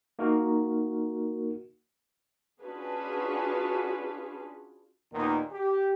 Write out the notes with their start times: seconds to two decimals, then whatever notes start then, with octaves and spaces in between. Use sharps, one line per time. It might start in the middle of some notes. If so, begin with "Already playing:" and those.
0.19 A#3 D#4 F#4 A#4
2.61 C#4 D4 F4 F#4 G#4 B4
5.12 D#2 A#2 D#3 B3 D#4
5.51 G4